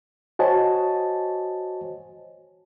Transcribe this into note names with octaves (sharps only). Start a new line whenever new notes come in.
F#4 C5 C#5 D#5 G#5 A5